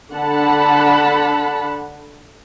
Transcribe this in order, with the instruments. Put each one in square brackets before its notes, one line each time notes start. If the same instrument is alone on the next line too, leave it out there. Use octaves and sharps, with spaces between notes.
[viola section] D3 F#5 A5 B5